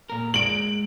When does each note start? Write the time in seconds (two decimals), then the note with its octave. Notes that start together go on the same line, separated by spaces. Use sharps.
0.10 A#2 A#4
0.34 G#3 D7 F#7